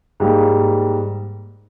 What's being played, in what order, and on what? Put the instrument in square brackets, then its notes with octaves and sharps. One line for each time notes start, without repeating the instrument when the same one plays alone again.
[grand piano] G#2 G3 A#3